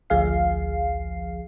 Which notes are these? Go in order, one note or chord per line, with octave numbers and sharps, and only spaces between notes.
A1 D2 F3 G#4 F5 C7